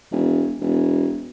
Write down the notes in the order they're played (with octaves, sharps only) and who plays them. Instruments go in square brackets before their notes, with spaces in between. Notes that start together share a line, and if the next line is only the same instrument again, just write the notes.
[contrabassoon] E1
E1